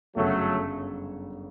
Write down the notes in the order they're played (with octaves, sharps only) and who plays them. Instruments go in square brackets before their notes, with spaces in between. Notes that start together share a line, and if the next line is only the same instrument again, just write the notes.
[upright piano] G1 F#2 C#3 [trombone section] F#3 A3